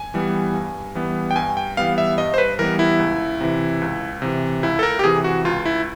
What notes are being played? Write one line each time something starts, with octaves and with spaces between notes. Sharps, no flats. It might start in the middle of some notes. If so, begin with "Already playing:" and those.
Already playing: G#5
E3 G3 B3
G2
E3 G3 B3
G5
G2 G#5
G5
E3 G3 B3 F5
E5
G2 D#5
C5
B4
E3 G3 B3 A#4
E4
C#2
C3 E3
C#2
C3 E3
C#2 E4
A4
A#4
G4
C3 E3 G#4
F#4
C#2 F4
E4